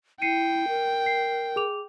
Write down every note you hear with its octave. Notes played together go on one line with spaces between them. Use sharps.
E4 G5 C7 C#7 D#7
A#4
C7
G#4 D6 F7